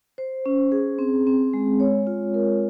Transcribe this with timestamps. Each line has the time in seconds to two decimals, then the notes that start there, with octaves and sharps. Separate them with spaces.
0.18 C5
0.46 C#4
0.72 G#4
0.99 C4
1.27 C4
1.54 G#3
1.80 C#5
2.07 F4
2.34 A#4